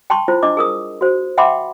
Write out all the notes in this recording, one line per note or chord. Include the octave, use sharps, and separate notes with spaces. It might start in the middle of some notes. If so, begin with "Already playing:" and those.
G5 A5 C6 C#6
E4 F4 C5
D4 D#5 D6
G#4 A#4 D#6
F#4 C5
E5 F#5 G5 B5 C6 D6